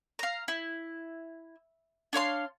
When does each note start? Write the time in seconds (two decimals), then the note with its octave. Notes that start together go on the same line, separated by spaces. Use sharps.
0.19 F5 A#5
0.48 E4
2.13 D4 C#5 F5 C6